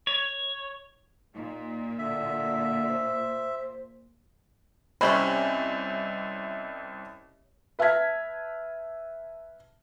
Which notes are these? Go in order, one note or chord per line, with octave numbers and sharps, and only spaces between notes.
C#5
A#2 D#4
D3 E5
C5
C2 C4 C#4 G4 C#5 D#5 E5 B5
B4 E5 A5 F6 G#6 B6